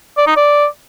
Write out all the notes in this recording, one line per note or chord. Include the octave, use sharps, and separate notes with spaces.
D5
D#4
D5